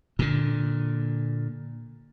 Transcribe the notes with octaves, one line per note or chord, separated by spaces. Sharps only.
A#2 D3